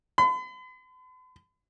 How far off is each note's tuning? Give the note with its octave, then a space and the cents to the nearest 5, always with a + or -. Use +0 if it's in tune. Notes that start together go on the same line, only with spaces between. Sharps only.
B5 +45